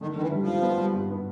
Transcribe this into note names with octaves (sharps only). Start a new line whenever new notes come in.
D3 D#3
D3 D#3
E3
G3
F3
G3
B3
G3
G2
B3